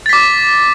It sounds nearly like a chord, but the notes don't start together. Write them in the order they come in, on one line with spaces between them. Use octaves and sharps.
A6 B6 D6